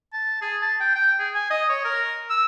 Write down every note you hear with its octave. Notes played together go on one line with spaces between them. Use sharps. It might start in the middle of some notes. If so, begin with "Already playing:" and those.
A5
G#4
A5
G5
G5
G#4
G#5
D#5
C#5
A#4
E6